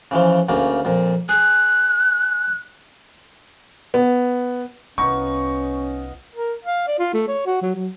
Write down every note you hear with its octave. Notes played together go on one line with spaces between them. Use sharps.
C#3 E3 F3
D2 C#3 A#3
F2 A#2
G#4 F#6
B3
C2 B3 C#4 D#4 F4 C#6
A#4
F5
D5
F4
A3
C#5
F#4
F#3
F#3